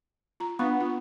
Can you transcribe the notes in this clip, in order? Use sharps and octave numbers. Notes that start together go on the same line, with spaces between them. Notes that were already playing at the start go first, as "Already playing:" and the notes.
F4 A#5
B3 D4 F5 C#6
F4